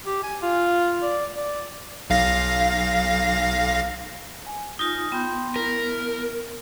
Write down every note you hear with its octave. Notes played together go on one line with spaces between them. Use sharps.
G4
G#5
F4
D5
D5
B1 F5 A#6
G#5
D#4 F4 D#6 G6 A#6
B3 G5 C6 G6
E4 A#4 B6